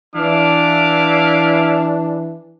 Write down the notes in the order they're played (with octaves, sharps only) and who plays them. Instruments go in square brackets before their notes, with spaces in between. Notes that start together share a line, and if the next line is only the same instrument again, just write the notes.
[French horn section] E3 [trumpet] D4 [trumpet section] E4 F5 D6